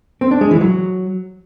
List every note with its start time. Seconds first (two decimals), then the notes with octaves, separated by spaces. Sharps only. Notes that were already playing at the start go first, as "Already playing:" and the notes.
0.21 C4
0.31 D4
0.41 G#3
0.51 E3
0.61 F#3